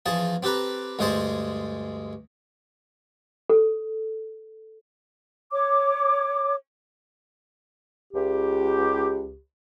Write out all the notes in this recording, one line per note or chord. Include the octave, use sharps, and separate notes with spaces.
E2 F3 G#4 A5
C4 G4 A4 B4 A#5
D2 G2 G#3 G#4 C5 A5
A4
C#5 D6
C#2 G4